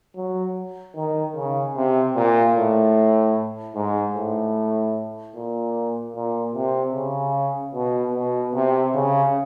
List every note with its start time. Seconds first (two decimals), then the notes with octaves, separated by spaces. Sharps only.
0.16 F#3
0.96 D#3
1.36 C#3
1.76 C3
2.16 A#2
2.55 A2
3.75 G#2
4.15 A2
5.35 A#2
6.15 A#2
6.55 C3
6.94 C#3
7.74 B2
8.15 B2
8.54 C3
8.94 C#3